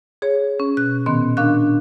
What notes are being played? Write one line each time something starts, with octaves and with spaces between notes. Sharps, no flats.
G#4 C#5
C#4
B2 F#6
A#2 D#3 B3 C#4 C6
D4 A#4 F5 C#6 F#6